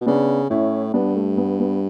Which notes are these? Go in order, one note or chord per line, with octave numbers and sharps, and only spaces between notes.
B2
C#3 B3 D4
A2 C#4 E4
G2 B3 D4
A3
B3
B3